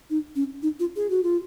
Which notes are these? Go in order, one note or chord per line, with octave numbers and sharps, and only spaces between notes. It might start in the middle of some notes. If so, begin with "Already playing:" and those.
D#4
C#4
D#4
F4
G#4
F#4
F4